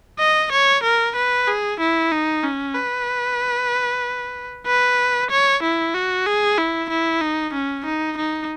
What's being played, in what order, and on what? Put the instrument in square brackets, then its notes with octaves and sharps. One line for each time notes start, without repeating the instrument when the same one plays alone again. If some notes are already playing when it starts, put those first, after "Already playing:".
[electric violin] D#5
C#5
A#4
B4
G#4
E4
D#4
C#4
B4
B4
C#5
E4
F#4
G#4
E4
E4
D#4
C#4
D#4
D#4